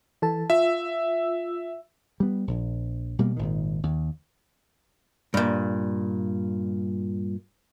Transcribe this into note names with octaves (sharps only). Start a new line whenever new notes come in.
E3 A4 A5
F4 E5 E6
G3 B3
A#1
B2 G3 A#3
G#1 A#2 D#3
D#2
G2 A#2